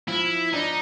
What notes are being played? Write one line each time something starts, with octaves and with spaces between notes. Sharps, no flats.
F3 E4
D4 D#4